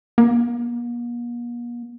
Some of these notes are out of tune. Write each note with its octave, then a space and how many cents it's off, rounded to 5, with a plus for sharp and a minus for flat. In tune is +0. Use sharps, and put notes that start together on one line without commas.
A#3 +45